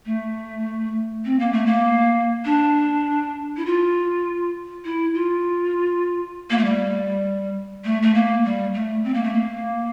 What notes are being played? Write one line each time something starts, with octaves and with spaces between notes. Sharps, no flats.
A3
C4
A#3
A3
A#3
D4
E4
F4
E4
F4
A#3
A3
G3
A3
A3
A#3
G3
A3
C4
A#3
A3
A#3